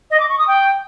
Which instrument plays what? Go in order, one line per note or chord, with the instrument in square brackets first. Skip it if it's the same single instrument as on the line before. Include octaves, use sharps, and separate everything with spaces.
[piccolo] D#5
D6
C#6
D#6
G5